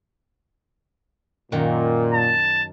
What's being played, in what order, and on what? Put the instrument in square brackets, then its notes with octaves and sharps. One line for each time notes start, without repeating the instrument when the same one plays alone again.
[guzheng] F#2 D#3 F#5 [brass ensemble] A#2
[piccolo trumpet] A5